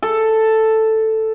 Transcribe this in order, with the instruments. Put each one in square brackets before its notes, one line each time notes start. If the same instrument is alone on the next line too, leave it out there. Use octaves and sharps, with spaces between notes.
[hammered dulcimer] A4